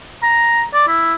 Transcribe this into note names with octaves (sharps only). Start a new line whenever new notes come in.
A#5
D5
E4